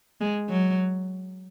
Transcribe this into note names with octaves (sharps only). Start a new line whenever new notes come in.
G#3
F#3